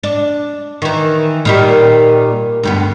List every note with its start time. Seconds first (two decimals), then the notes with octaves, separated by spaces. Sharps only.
0.03 D4
0.82 D#3 E3
1.45 A#2 D#3 G3
2.63 D2 G2 B3